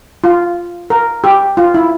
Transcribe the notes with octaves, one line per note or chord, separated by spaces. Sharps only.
F4
A#4
G4
F4
E4